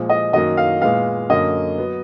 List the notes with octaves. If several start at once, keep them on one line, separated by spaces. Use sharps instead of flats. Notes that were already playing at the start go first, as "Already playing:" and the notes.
Already playing: A#2 F3 G#3
D#5
F#2 D#3 F#3 A#3 D#5
F5
A#2 G#3 B3 F5
F#2 D3 F#3 A#3 D#5
F#3 B3